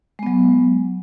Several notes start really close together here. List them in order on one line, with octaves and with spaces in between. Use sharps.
G#3 B3 F#3